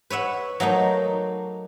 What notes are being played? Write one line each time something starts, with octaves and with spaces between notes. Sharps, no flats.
B4 C#5 E5 F#5
F#3 A3 A#3 D#4